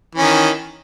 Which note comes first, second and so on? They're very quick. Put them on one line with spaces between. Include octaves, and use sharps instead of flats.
E3 C#4 D#3